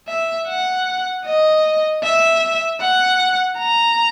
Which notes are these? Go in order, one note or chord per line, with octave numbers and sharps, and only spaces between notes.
E5
F#5
D#5
E5
F#5
A#5